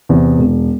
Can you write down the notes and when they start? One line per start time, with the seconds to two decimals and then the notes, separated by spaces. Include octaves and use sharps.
0.09 E2 C3
0.38 E1